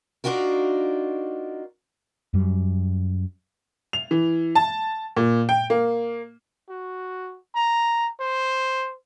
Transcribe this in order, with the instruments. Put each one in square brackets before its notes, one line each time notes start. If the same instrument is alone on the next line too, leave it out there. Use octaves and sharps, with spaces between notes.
[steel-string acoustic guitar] D4 D#4 F4 F#4 A#4
[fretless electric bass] F#2 G3
[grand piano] F7
E3
A5
A#2
G5
A#3
[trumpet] F#4
A#5
C5